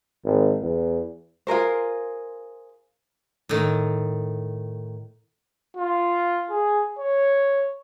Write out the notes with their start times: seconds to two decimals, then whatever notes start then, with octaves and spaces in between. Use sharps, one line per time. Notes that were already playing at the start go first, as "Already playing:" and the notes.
0.24 G#1
0.62 E2
1.47 F4 G#4 A#4 C5
3.49 A2 D#3
5.77 F4
6.50 G#4
6.99 C#5